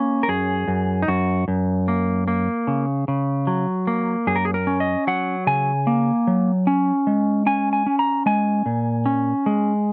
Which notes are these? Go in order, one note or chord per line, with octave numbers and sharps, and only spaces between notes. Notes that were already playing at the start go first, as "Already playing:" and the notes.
Already playing: A#3 C#4
A#4
F#2 G#4
F#2
D#4
F#2 F#4
F#2
A#3
A#3
C#3
C#3
F#3
A#3
F#2 G#4
A#4
G#4
A#4
C#4
D#5
F#3 F#5
C#3 G#5
A#3
F#3
C#4
G#3
C#4 G#5
G#5
C#4
A#5
G#3 G#5
A#2
C#4
G#3